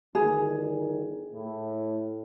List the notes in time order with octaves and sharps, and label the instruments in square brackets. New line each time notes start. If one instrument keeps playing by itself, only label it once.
[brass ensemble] G1 D2 D#3 [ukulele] G#4
[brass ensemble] A2